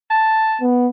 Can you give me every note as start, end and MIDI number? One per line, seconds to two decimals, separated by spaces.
0.10 0.60 81
0.61 0.87 59